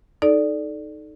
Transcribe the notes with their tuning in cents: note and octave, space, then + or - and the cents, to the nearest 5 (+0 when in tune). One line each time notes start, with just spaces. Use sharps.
D#4 +0 A4 -20 D5 +0